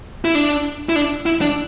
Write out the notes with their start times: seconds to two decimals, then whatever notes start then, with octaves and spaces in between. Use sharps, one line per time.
0.25 E4
0.35 D4
0.89 E4
0.96 D4
1.26 E4
1.41 D4